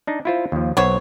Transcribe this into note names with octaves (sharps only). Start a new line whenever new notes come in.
D4 D#4
E4 F4 C5
D#2 F3
B1 B3 C5 C#5